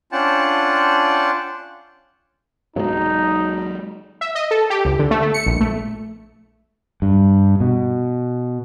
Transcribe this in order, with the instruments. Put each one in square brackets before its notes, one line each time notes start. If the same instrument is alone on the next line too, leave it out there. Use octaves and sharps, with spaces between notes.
[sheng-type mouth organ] C#4 D4 F4 F#5 G5 A5
[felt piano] B1 [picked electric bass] F#3 G#3 [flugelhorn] D#4
[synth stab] E5
D#5
A4
G4
C#2
D3
A3
A3
C#7
A#1
A3
[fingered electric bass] G2
B2